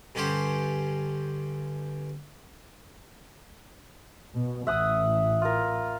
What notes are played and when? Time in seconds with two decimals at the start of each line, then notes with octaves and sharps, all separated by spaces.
0.15 G2 D3 C#4 G4 C5
4.34 B2
4.67 A1 E5 F#5 D#6
5.42 F4 A#4